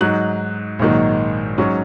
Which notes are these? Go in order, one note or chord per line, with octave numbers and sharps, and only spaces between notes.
G#2 F#3 D#4 F#6
A#1 G#2 D#3 F#3
G#2 F#3 C#4